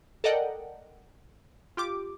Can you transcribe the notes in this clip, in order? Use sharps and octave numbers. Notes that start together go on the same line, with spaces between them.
A4 A#4 D5 D#5 F#5 G5
F4 G4 D6